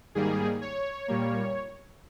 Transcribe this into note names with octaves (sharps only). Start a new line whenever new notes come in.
G#2 D#3 G3 A#3 G#4
C#5
A#2 G3 A#3